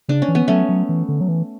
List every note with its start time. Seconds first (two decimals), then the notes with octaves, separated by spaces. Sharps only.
0.09 C#3 D4
0.22 C#4
0.28 E3
0.35 B3
0.48 F#3 A3 C#4
0.69 F#3
0.89 E3
1.09 D3
1.21 F#3
1.29 E3